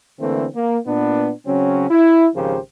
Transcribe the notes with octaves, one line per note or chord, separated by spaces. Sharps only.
D3 E3 A3 A#3 C4
A#3
A#2 B3 D4
C#3 F#3 C4 C#4
E4
G#1 C#3 F3 G4 A#4 C5